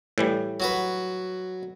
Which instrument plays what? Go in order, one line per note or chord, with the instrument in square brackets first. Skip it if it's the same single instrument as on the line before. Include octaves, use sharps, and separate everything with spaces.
[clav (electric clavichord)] A2 E3 G3
[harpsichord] F#3 F#4 B4